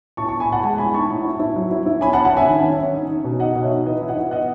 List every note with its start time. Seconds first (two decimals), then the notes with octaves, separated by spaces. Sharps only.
0.17 A2 A5 C#6
0.28 A5 C#6
0.33 A2
0.40 G#5 B5
0.49 A2 F#5 A5
0.63 G#3 F#5 A5
0.78 A2 G#5 B5
0.94 D#4 A5 C#6
1.10 A2
1.25 E4
1.40 E4
1.56 F#3
1.71 E4
1.86 E4
2.01 C#4 G#5 B5
2.13 F#5 A5
2.18 C#4
2.25 F#5 A5
2.32 C#4 E5 G#5
2.48 D#3
2.63 C#4
2.79 C#4
2.94 D#4
3.09 D#4
3.24 B2
3.39 D#4 D#5 F#5
3.56 B2
3.63 C#5 E5
3.71 D#4
3.86 E3 B4 D#5
4.02 E4
4.09 D#5 F#5
4.17 E4
4.31 B3 D#5 F#5